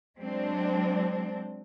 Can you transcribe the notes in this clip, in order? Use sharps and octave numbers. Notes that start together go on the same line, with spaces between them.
F#3 G#3 C4 D4